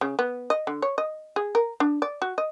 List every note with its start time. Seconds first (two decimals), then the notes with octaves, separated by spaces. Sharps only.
0.01 C#3
0.19 B3
0.50 D#5
0.67 D3
0.82 C#5
0.98 D#5
1.36 G#4
1.55 A#4
1.80 D4
2.02 D5
2.22 F#4
2.38 D#5